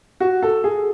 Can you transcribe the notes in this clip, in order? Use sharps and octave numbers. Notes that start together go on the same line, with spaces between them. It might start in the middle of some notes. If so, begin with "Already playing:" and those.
F#4
A4
G#4